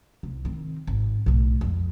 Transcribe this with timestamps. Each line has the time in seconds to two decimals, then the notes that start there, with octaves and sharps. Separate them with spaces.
0.23 C2
0.45 D#3 C4
0.87 G#1
1.26 B1 A2
1.61 F2 G#3